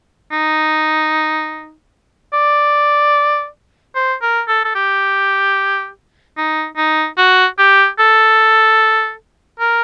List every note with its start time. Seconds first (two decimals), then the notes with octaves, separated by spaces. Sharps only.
0.32 D#4
2.33 D5
3.95 C5
4.22 A#4
4.48 A4
4.65 A4
4.75 G4
6.38 D#4
6.77 D#4
7.18 F#4
7.58 G4
7.99 A4
9.60 A#4